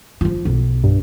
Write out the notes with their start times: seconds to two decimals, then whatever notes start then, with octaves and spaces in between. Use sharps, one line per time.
0.21 F3 F4
0.45 B1
0.84 G2